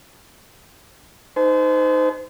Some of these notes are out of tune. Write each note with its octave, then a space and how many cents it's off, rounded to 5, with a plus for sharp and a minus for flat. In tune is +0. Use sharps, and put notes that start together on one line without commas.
D#4 +0 C5 -30 A5 -45